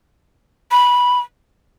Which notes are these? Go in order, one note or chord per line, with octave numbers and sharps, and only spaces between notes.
B5